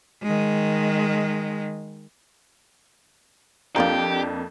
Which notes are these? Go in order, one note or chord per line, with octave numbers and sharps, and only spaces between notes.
D#3 G#3
F2 A#3 D4 F4 G4 D#5 A#5